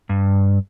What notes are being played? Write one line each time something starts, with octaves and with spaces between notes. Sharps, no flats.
G2